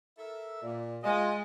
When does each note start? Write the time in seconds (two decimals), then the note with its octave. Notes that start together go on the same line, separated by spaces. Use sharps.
0.19 A4 A#4 E5
0.63 A#2 D5
1.04 G#3 F4 D#5 G#5